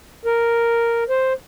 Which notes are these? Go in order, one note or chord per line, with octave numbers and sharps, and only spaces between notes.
A#4
C5